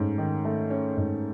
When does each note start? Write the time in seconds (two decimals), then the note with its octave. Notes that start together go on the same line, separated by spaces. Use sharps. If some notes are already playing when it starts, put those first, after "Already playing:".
Already playing: G#2 A3 C#4
0.18 D#3
0.45 A3
0.70 C#4
0.97 G#2